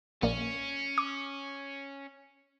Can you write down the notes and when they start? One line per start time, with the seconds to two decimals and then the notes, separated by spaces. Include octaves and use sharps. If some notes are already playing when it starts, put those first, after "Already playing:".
0.22 A#1 A#3 C#4 D5
0.98 D6